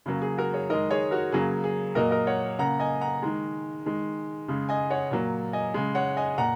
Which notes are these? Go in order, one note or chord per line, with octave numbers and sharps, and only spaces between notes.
C#3 F#3 A#3
G#4
F#4 A#4
G#4 C#5
D#3 G#3 A#4 D#5
G#4 C#5
F#4 A#4
C#3 F#3 A#3 G#4
G#4
A#2 F#3 A#3 A#4 D#5
A#4 D#5
C#5 F#5
C#3 A#3 F#5 A#5
D#5 G#5
F#5 A#5
D#3 G#3
D#3 G#3
C#3 G#3
D#5 G#5
C#5 F#5
A#2 F#3 A#3
D#5 G#5
C#3 G#3
C#5 F#5
D#5 G#5
A#2 F#5 A#5